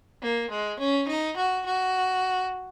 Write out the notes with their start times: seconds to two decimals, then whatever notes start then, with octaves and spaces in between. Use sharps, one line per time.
0.22 A#3
0.50 G#3
0.80 C#4
1.08 D#4
1.37 F#4
1.66 F#4